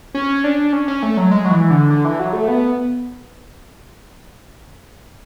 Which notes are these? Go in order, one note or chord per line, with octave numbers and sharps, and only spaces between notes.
C#4
D4
C#4
C#4
A3
F#3
G#3
F#3
E3
D3
D3
E3
F#3
A3
B3